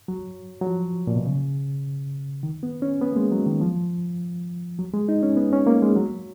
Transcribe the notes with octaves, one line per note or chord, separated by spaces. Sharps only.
F#3
F#3
F3
A#2
B2
C#3
D#3
B3
C#4
B3
A#3
G#3
F#3
D#3
F3
F#3
G#3
D#4
C#4
B3
C#4
A#3
G#3
F#3